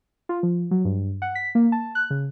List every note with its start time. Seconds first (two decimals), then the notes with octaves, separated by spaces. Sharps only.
0.29 F4
0.43 F3
0.71 F#3
0.85 G2
1.22 F#5
1.35 B6
1.55 A#3
1.72 A5
1.95 F#6
2.10 C#3